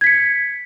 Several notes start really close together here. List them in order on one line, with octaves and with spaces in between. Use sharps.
G#6 B6 C#7